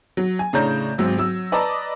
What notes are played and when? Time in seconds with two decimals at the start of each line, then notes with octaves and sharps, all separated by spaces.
0.17 F#3
0.39 G#5
0.53 A2 C#3 D4 C#5 A#5 G6
0.98 G#1 G#2 F#3 E6
1.18 F#3 E6
1.52 B4 D5 D#5 A5 A#5